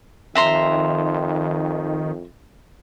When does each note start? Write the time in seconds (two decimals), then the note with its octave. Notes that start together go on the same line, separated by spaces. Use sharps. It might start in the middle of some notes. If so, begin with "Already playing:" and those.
0.35 F2 D#3 E5 A#5 C6